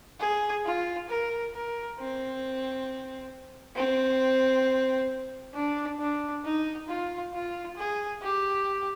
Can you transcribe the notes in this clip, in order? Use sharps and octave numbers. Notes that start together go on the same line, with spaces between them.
G#4
F4
A#4
A#4
C4
C4
D4
D4
D#4
F4
F4
G#4
G4